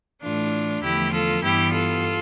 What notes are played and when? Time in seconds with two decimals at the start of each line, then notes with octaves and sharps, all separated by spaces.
0.22 A2 E3 A3 D4 F4
0.82 E2 D3 F3 A3 E4 G4
1.12 F4 A4
1.42 G2 E3 G3 B3 E4 G4
1.72 F4 A4